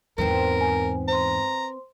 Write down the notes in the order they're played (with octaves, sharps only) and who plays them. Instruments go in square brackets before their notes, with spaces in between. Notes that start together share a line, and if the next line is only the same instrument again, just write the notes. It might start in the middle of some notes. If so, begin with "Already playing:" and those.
[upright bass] E2 G#2 [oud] B3 C4 [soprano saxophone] A#4
[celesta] G#5
[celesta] C5 C6 [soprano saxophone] A#5